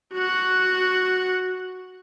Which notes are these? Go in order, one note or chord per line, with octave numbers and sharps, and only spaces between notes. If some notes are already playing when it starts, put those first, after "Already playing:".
F#4 F#5